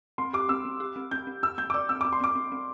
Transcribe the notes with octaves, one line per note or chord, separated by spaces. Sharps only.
C4 C6
G4 D6
C4 E6
C4
G4
C4
C4 G6
C4
C4 E6
C4 G6
D6
D5 E6
C4 E6
C4 D6
C6
C4 D6
C4
C4